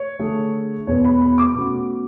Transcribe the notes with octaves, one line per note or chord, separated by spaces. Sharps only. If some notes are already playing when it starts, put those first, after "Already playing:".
Already playing: C#5
D3 A3 D4 G#4
E2 B2 G#3 B3 C#5
B5
B5
D6
B2 A3 C#4 F#4